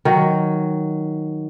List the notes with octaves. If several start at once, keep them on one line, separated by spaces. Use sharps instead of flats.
D#3 F#3